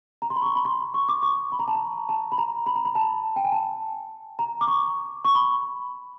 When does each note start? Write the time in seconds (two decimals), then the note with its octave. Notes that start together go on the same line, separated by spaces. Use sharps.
0.22 A#5
0.30 C6
0.36 B5
0.42 C#6
0.46 C6
0.56 B5
0.65 C6
0.94 C#6
1.09 D6
1.22 C#6
1.52 B5
1.59 A#5
1.68 A5
1.75 A#5
2.09 A5
2.32 B5
2.38 A#5
2.66 B5
2.76 A#5
2.85 B5
2.95 A5
3.36 G5
3.45 G#5
3.52 A5
4.39 A#5
4.61 D6
4.67 C#6
5.25 C#6
5.35 B5